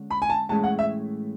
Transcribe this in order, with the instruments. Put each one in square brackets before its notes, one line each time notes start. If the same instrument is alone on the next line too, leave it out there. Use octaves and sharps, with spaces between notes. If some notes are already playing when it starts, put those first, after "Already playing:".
Already playing: [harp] D3 G#3 C#4
[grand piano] B5
G#5
A5
[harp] A2 E3 G#3 C#4 G#4 [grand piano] A5
[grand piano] F#5
E5